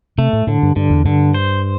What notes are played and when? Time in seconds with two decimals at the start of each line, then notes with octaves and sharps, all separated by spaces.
0.18 C3 A3
0.33 A2
0.47 A2 D3
0.63 G2
0.76 G2 D3
0.90 E2
1.05 G2 D3
1.34 C5